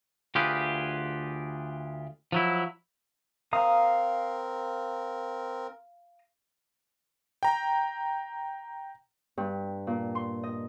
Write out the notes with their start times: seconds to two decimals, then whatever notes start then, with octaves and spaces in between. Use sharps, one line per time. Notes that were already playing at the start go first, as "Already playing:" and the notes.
0.35 D2 F4 G4 G#4 B4
2.32 F3 F#3 E4
3.53 C4 A#4 F5 A#5 D#6
7.43 G5 A#5
9.37 G2
9.87 A#2
10.15 C6
10.43 D#5